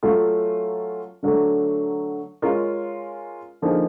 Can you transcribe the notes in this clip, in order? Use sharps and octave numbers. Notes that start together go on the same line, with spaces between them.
F#3 A3 C#4 F4
D3 F#3 A3
G#3 C#4 F4 A#4
D3 F3 A#3 D#4 G#4